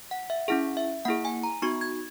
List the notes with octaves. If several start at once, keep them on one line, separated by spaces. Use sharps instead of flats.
F#5
E5
C#4 E4 G#4 F#5
E5
A#3 E4 G#4 F#5
G#5
A#5
B3 D#4 F#4 C#6
G#6